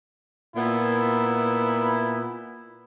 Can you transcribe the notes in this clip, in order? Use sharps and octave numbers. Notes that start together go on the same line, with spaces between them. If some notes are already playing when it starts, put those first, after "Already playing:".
A#2 B3 E4